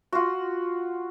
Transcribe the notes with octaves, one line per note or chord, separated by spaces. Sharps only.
F4 F#4